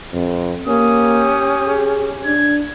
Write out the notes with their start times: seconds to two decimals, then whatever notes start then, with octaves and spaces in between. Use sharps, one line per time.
0.13 F2
0.67 A#3 C#4 G4 D#6
1.67 G#4
2.25 D4 G#6